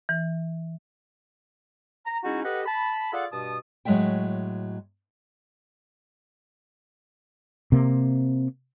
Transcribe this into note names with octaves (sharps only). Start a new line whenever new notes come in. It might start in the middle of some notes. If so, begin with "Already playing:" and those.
E3
A#5
G#3 C#4 D#4 E4 F#4
G4 A4 B4 D#5 F#5
A5 B5
F4 G#4 A4 D5 F5 F#5
G2 B2 A5 D#6
A2 F#3 G#3 A3 E5 G5
C3 A#3